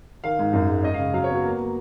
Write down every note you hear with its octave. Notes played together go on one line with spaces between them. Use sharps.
D#3 F5
G#2
F#2
G#3
C#4 D#5
F5
C#3
F#3 F5
C#5
B3
F#4
A#3
A#3